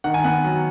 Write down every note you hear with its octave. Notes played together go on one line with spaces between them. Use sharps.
D#3 F#5
G#5
B3 F#5
F#3